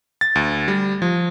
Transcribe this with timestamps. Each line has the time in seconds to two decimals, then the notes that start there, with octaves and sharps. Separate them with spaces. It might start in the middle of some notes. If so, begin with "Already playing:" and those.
0.21 A6
0.35 D2
0.68 G3
1.02 F3